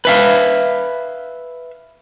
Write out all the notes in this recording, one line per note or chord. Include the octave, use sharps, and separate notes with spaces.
B4 E5 F5